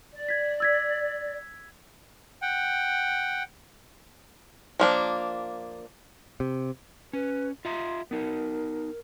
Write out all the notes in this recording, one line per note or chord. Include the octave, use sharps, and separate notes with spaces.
D5
G#6 B6
E6 G#6 B6
F#5 G5
F3 A#3 D4
C3
C#4 B4
F4 E5 A#5 C6
B3 D#4 A#4